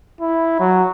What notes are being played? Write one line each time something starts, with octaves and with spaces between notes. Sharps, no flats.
E4
F#3